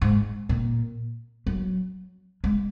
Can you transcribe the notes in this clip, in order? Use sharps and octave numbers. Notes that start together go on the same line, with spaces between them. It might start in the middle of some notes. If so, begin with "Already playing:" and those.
G#2
A#2
F#3
G#3